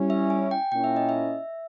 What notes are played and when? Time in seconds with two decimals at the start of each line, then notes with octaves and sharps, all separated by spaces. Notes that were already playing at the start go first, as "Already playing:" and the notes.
Already playing: G3 C#4 E4
0.10 E5
0.30 G#5
0.51 G5
0.72 A#2 A#3 C#4 E4 G5
0.84 E5
0.97 D#5
1.09 E5